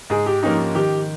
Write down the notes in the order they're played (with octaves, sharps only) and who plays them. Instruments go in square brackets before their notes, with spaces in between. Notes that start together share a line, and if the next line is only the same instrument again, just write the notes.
[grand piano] G#2 [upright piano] G#4
[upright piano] G4
[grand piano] F3 A#3 C#4 G4 [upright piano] D#4
[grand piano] D#3 [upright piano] G4